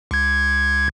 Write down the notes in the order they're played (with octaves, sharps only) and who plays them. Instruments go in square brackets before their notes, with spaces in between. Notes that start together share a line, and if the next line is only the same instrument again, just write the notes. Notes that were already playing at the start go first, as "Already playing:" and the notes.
[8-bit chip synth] C#2 G#6